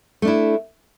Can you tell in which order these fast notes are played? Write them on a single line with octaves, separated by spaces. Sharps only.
A3 D4 E4